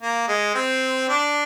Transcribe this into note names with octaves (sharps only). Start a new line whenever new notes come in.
A#3
G#3
C4
D4